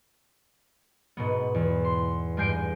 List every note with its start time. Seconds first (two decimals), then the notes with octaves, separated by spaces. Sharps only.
1.17 G#2 B2 B3
1.54 E2
1.85 C6
2.37 G2 G#3 G#5 G6 C7 D7